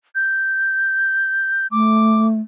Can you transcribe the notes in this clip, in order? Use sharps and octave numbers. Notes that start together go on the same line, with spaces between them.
G6
A3 D6